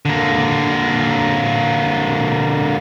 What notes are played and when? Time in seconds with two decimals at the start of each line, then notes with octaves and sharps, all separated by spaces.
0.05 D3 A#3